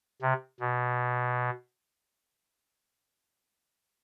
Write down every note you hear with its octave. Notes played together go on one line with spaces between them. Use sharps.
C3
B2